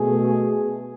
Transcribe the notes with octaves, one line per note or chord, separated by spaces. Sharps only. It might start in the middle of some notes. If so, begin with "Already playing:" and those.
Already playing: B2 A3 G#4